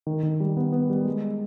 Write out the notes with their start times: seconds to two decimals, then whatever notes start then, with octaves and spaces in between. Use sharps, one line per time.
0.07 D#3
0.23 D#3
0.40 G3
0.57 B3
0.72 B3
0.90 G3
1.05 G#3